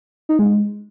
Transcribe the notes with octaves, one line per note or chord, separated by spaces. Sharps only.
D#4
G#3